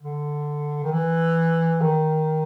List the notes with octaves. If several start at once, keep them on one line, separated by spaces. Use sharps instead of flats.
D3
D#3
E3
D#3